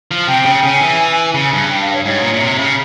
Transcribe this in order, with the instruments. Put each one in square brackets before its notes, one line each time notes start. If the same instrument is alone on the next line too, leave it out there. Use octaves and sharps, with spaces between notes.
[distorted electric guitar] F3
[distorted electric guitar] C3 [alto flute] G5
[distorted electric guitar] C#3
[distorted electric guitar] C#3 [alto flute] G#5
[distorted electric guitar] E3
C#3
G2
[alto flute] G5
F5
C#5
[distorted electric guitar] G#2 [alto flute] C#5
[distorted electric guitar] A#2
A#2
C3
C#3